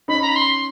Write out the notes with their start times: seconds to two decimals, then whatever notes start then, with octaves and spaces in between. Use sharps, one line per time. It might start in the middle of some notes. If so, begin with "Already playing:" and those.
0.08 C#4 D#4 B5
0.22 A#5
0.29 B5
0.36 C6